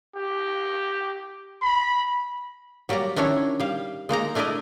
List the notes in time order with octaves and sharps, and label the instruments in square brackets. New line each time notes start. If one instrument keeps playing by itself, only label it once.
[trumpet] G4
B5
[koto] F#3 G3 A#3 D5 A#5
D#3 C#4 D4 E4 C#5
G3 F5
G#3 A#3 D#4 A#5
A3 D4 E4 A#4 D5 D#5